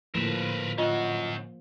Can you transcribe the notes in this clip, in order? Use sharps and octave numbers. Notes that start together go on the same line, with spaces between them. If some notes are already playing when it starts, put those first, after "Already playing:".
A2 D3 F3 A#3 A#4 B4 E7
C#4 F4 D#5 F#5